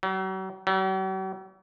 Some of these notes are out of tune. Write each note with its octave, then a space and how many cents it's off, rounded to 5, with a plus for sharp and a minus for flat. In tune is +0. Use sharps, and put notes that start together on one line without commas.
F#3 +40
F#3 +45